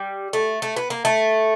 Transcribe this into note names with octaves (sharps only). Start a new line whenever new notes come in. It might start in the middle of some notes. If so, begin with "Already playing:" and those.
Already playing: G3
A3
A3
B3
A#3
A3